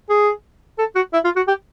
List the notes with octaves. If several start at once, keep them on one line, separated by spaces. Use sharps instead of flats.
G#4
A4
F#4
E4
F4
F#4
G4